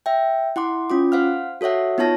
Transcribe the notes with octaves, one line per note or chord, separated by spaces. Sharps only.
E5 G5
E4 F#5 C6 D6
C#4 F4 D6
C5 F5 F#5 F6
F#4 A4 C#5 E5 F#5
B3 D#4 F4 C#5 A5 A#6